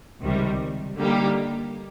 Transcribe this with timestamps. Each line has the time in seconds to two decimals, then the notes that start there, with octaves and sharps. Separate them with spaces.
0.22 C#2 C3 D#3 G3
0.97 D3 G3 A#3 D#4 G4